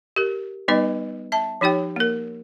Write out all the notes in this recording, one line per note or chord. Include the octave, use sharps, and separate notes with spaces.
G4 A#4
G3 B3 D#4 B4 D#5
E5 A5
F3 D#4 G4 C#5 G5
A#3 A#4